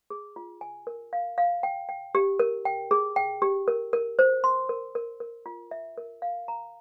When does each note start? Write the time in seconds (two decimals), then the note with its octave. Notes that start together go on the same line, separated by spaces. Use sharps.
0.10 G#4
0.36 F4
0.61 G#5
0.87 A#4
1.13 F5
1.38 F5
1.63 G5
1.89 G5
2.15 G4
2.39 A#4
2.65 G5
2.91 G#4
3.16 G5
3.42 G4
3.68 A#4
3.93 A#4
4.19 C5
4.44 C6
4.69 A#4
4.95 A#4
5.20 A#4
5.46 F4
5.71 E5
5.97 A#4
6.22 F5
6.48 A#5